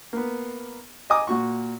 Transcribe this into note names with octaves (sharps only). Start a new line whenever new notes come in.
A#3 B3
D#5 G#5 A#5 D6 D#6
A#2 F#4 C#6